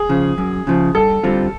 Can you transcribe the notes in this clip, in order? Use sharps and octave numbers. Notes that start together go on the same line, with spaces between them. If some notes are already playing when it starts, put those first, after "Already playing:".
Already playing: G#4
C#3 F3
F#2
C#3 F3
G2 A4
D3 G3 C4 F4